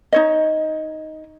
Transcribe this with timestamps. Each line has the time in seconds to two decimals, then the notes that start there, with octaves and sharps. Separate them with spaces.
0.12 D#4 C#5 D#5